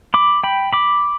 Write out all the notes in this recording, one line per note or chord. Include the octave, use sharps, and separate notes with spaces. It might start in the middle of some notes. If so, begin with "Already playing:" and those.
B5 D6
G5 B5
B5 D6